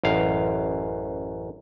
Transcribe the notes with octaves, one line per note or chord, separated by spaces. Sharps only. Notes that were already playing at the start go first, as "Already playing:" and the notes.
A1 F#2 F5